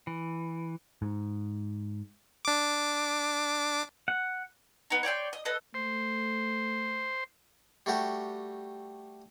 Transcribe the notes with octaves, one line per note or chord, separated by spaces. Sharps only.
E3
G#2
D4 D6
F#5
B3 D#4
C#5 D5 G5 C6
D#5
A4 B4 D#5
A3 C5
G3 A3 F#4 G4